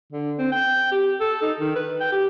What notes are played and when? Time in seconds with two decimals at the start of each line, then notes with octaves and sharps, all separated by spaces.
0.12 D3
0.39 C4
0.52 G5
0.92 G4
1.20 A4
1.42 D#4
1.59 D#3
1.75 B4
2.00 G5
2.12 G4